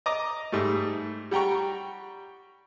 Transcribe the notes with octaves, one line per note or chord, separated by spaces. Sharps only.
D#5 A#5 D6
G#2 G3 A3
G3 F#5 G5 A#5 C#6